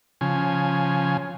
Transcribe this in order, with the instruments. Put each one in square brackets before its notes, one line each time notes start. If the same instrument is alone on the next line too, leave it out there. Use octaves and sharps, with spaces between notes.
[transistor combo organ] C#3 F3 G#5